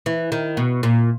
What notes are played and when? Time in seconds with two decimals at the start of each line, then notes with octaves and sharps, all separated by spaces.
0.06 E3
0.32 D#3
0.57 B2
0.83 A#2